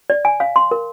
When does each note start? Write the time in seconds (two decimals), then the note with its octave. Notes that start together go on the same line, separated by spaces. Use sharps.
0.10 D5
0.25 G#5
0.40 F5
0.56 C6
0.71 A#4